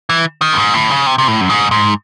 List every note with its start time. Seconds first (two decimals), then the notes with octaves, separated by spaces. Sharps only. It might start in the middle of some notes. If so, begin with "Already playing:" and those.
0.10 E3
0.42 D#3
0.53 F#2
0.58 G#2
0.74 A2
0.91 C#3
1.06 C3
1.18 C3
1.28 A2
1.41 F#2
1.49 G#2
1.71 G#2